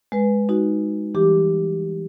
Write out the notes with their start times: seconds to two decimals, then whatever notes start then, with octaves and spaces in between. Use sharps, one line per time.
0.12 G#3 B4
0.49 D#4 F#4
1.15 E3 G3 G4 D6